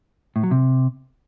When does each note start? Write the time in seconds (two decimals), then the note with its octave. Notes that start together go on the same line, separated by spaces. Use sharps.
0.36 A2
0.43 F#3
0.51 C3